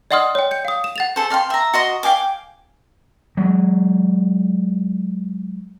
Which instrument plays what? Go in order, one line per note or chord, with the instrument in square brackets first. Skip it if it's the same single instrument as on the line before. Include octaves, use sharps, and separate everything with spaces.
[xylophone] D5 D#5 F#5 C6 D#6 F6
C#5 G5
G6 C#7
F5 D#6
E7
F#5 A6 F7
[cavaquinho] G#4 A4 C5
D5 F5 G5 C6
E5 A#5
F#4 D#5 C6 D#6
F5 G5 G#5 D6
[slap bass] F#3 G#3